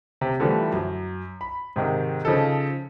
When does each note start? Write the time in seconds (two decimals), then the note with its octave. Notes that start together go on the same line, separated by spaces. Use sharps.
0.21 C3
0.40 D3 E3 F3 G3 A3
0.73 F#2
1.41 B5
1.76 G#2 C3 D#3
2.25 C#3 F3 D#4 A4